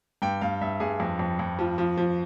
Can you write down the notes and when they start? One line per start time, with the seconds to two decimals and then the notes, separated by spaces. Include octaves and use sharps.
0.22 G2 G5
0.41 G2 F5
0.61 G2 E5
0.80 G2 G#4
1.00 F2
1.19 F2
1.39 F2
1.59 F3
1.78 F3
1.97 F3